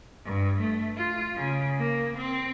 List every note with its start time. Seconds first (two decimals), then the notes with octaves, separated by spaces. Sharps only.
0.25 G2
0.61 A3
0.97 F4
1.36 C#3
1.78 A#3
2.18 C4